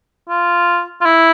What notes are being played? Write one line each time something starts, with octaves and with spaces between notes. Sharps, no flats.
F4
F4
E4